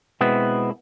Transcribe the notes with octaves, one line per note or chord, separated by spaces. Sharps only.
B2 G#3 B3 C4 E4